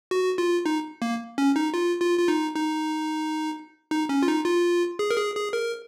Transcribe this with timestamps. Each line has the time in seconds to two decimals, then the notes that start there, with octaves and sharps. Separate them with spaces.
0.11 F#4
0.38 F4
0.66 D#4
1.02 A#3
1.38 C#4
1.56 D#4
1.74 F4
2.01 F4
2.19 F4
2.28 D#4
2.55 D#4
3.91 D#4
4.09 C#4
4.23 F4
4.27 D#4
4.45 F4
4.99 G#4
5.11 A#4
5.17 G#4
5.36 G#4
5.53 A#4